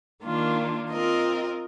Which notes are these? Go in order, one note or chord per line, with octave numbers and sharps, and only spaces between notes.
D#3 A#3 D4 F4
C4 F4 A#4 D#5